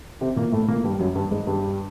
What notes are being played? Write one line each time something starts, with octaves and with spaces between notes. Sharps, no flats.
C3 C4
A#2 A#3
A2 A3
A#2 A#3
G2 G3
G3
F#2 F#3
G2 G3
G#2 G#3
G2 G3